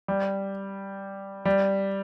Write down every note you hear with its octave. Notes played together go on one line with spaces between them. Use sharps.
G3
G3